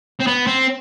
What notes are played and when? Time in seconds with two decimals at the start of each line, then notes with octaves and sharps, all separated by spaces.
0.20 C4
0.27 B3
0.47 C4